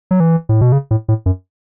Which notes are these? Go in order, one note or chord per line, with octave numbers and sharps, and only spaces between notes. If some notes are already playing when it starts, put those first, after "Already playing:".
F#3
E3
A2
B2
C#3
A2
A2
F#2